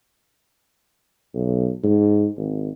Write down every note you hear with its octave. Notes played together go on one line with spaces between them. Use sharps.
B1
G#2
G#1